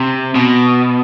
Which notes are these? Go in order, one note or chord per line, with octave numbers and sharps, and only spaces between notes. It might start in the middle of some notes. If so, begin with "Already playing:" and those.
Already playing: C3
B2